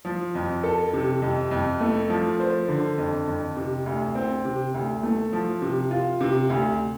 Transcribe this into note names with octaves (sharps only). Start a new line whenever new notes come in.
F3
F2
A4
C3
F2
F2
A3
F3
C5
D3
F2
F2
C3
D2
C4
C3
D2
A3
F3
C3
F4
C3
D2